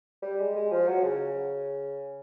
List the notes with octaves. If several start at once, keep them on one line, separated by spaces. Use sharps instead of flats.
G3
G#3
G#3
F3
F#3
C#3